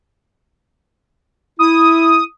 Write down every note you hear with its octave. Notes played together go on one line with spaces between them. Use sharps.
E4 D#6